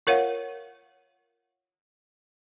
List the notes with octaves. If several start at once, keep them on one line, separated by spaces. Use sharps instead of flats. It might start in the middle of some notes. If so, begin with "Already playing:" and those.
F4 A#4 C#5 F5 F#5